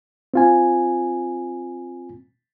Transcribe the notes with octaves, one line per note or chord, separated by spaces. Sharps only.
C4 F4 G#5